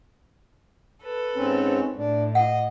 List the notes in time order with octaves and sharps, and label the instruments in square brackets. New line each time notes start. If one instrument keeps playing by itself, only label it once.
[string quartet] A4 B4
[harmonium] G#2 C4 C#4
[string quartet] A2 [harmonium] D4
[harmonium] D#5 [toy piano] F#5